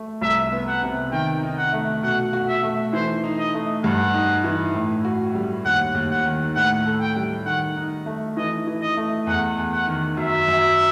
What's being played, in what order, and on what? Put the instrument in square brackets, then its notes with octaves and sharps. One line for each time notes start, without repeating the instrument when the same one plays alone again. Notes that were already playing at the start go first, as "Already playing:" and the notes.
Already playing: [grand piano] A3
[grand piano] C2 [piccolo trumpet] E5
[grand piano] B3
[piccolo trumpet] F#5
[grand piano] C3
[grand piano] D#3 [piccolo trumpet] G5
[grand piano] D#4
[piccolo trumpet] F#5
[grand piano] A3
[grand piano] B2 [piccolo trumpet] F#5
[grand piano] F#4
[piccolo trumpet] E5
[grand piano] A3
[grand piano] E3 [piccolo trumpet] C5
[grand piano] D#4
[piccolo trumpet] D#5
[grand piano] A3
[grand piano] G2 [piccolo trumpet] F#5
[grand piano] D#4
E3
A2
F#4
G3
[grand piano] D#2 [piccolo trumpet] F#5
[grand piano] D#2
[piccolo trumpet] F#5
[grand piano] D#3
[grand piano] A2 [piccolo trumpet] F#5
[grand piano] A4
[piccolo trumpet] G5
[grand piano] G3
[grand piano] D#3 [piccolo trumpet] F#5
[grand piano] D#4
A3
[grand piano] E3 [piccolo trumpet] D#5
[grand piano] E3
[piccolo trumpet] D#5
[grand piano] A3
[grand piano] E2 [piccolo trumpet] F#5
[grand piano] E2
[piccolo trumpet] F#5
[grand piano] D#3
[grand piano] F#2 [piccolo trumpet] E5
[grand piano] F#2